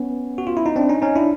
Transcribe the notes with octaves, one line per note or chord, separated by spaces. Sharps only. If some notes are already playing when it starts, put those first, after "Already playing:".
Already playing: B3 C#4
F#4
F4
E4
D#4
C4 D4
C#4 D#4
C#4 D#4
D4 E4